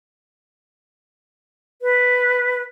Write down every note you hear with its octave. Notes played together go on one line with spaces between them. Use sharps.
B4